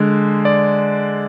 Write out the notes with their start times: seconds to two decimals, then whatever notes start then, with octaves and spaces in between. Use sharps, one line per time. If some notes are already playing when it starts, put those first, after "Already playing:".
Already playing: D3 G#3
0.45 D5